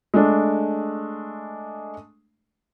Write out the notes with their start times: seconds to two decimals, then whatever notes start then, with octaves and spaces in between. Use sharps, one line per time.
0.14 G#3 A3 D4